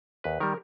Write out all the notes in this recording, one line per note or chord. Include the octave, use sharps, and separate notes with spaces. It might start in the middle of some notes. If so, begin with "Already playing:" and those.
D#2 B4
D#3 G3 A#4